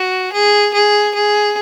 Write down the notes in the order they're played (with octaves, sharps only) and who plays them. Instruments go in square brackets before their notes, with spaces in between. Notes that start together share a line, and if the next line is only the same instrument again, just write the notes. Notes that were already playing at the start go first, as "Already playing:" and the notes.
Already playing: [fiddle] F#4
G#4
G#4
G#4